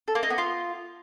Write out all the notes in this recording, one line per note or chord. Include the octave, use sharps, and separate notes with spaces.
A4
A#3
D#4
B3
F4